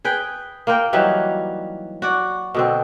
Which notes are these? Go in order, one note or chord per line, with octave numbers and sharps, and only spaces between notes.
G#4 B4 G5
A#3 F4 A#4 G5
E3 F#3 G3 D#4
F#4 D5
B2 D3 C4